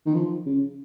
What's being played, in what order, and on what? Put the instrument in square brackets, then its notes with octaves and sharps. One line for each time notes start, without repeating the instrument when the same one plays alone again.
[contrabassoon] D#3
F3
C#3